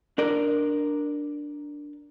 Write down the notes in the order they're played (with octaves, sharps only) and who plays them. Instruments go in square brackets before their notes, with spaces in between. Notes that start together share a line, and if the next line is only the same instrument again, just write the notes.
[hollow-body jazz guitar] D4 A#4 D5